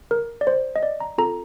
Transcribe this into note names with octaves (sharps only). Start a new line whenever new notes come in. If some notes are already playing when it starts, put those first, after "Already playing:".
A#4
D5
C5
D#5
D5
A#5
C4 F4 A4 A#5